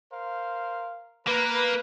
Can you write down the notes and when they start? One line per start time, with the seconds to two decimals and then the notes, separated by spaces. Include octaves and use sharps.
0.11 A#4 C5 F5
1.27 A#3 A#4 B4